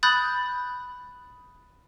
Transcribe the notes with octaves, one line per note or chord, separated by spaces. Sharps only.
B5 D#6 F#6 G6 A6